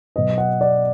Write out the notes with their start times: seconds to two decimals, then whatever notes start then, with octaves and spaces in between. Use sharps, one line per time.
0.16 B2 F#3 B3 D#5
0.38 F#5
0.61 D5